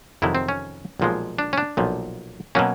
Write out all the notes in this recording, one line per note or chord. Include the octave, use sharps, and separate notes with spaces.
F2 C3 D#3 F#3 E4
C4
C#4
B1 A#2 F3 G#3
D4
C#4
D4
B1 A#2 F3
B2 F#3 A#3 C#4